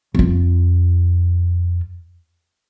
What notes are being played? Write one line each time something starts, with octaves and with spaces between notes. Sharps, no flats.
F2 F4